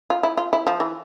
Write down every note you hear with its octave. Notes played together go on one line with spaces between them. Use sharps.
F4
E4
F4
E4
F3
E3